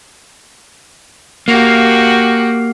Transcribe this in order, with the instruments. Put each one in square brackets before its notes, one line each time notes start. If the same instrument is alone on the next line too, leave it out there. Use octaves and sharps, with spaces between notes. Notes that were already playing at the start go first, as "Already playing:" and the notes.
[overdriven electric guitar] A#3 [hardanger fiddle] F#4 G4